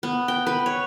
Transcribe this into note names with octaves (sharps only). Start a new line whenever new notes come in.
B3
G5
B4
C#5